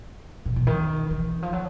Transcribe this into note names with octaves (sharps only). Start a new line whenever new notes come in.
B2
B2
D#3
E3
F3
F#3